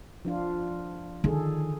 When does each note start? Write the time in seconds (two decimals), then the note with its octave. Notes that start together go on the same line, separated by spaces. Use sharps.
0.25 F3 D4 F4
1.24 D3 D#3 G#4 A4